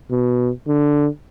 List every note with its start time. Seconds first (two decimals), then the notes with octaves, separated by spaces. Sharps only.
0.11 B2
0.68 D3